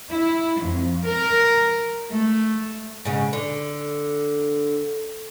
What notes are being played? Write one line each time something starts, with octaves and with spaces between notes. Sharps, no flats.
E4
F2
A#4
A3
G#2 C#3
D3